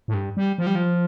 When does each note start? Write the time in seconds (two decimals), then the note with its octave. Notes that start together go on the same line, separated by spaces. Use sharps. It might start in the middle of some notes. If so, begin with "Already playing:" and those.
0.08 A2
0.14 G2
0.37 G3
0.58 F3
0.67 G3
0.75 F3